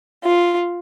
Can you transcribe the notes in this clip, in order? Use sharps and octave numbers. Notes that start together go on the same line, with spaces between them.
F4